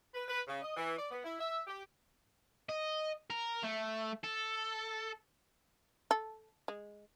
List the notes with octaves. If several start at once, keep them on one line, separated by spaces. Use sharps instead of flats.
B4
B4
C#3
D#5
E3
D5
B3
E4
E5
G4
D#5
A#4
A3
A4
A4
G#3